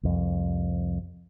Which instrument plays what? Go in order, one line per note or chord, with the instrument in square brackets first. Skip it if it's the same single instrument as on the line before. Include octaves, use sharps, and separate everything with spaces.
[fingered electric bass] C2 F2